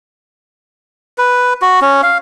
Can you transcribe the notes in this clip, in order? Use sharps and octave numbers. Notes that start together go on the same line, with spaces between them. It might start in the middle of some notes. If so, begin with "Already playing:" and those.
B4
F#4
C#4
F5